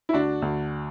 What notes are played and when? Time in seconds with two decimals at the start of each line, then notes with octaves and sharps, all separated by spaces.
0.09 E4
0.13 D2 D4 F#4
0.42 D2